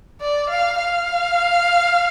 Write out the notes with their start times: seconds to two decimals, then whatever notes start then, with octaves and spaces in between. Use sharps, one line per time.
0.21 D5
0.50 F5
0.78 F5